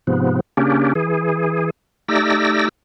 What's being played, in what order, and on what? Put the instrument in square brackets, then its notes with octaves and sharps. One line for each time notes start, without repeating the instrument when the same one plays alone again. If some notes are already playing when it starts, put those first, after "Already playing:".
[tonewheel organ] G#2 C3 F3 B3
C#3 A#3 C#4 D4 G4
E3 G#4
A3 D#4 G4 D5 E6 A#6